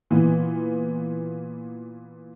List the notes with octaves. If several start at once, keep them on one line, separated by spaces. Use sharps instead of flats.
A#2 E3 B3